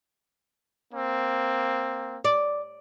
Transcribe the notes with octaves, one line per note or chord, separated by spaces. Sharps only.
A#3 C4
D5